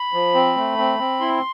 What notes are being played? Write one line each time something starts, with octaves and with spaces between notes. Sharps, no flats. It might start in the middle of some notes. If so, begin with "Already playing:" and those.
Already playing: B5
F3
C4
A3
C4
C4
E4 C6